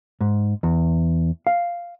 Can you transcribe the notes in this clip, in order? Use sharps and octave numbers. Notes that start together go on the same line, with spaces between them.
G#2
E2
F5